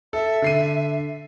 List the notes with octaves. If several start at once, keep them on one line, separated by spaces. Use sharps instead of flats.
A4 E5
D3 C7 D#7